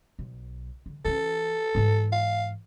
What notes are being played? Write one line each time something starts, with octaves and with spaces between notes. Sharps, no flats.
B1
D3
E3 C#4 A4
G#2 E3
F5